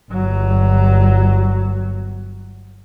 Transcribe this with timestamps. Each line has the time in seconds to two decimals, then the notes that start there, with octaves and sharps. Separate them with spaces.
0.11 G1 F#3